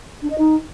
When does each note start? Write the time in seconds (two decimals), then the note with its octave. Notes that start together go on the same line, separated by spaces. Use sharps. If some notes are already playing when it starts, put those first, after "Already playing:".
0.22 D4
0.30 D#5
0.38 D#4